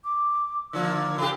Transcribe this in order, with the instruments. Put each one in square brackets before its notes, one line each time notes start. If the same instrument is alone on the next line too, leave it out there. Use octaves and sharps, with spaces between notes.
[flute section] D6
[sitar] D3 F3 A#3 [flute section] D5 E6
[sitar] C#3 G4 [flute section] A4 F5